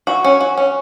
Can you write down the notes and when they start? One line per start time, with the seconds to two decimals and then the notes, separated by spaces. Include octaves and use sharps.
0.07 F#4
0.24 C#4
0.41 F#4
0.57 C#4